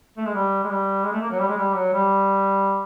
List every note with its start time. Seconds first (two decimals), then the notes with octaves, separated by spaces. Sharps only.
0.17 A3
0.26 G#3
0.34 G3
0.64 G#3
0.70 G3
1.04 G#3
1.13 A3
1.21 A#3
1.31 F#3
1.39 G3
1.48 G#3
1.57 G3
1.75 F#3
1.93 G3